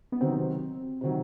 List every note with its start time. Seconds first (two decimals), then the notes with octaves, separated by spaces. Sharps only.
0.12 B3
0.21 C3 D#3 F#3 C4
1.01 C3 D#3 F#3